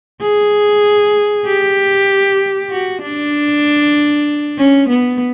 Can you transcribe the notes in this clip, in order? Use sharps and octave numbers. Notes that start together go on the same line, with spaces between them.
G#4
G4
F#4
D4
C#4
B3